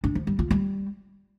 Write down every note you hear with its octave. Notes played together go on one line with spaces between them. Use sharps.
D4
F3
G3
F4
G3